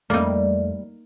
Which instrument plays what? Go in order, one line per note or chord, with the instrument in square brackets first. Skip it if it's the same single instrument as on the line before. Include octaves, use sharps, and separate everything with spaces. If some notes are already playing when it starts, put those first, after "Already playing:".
[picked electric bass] F2 A3 [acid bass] G3 [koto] A#3 D#4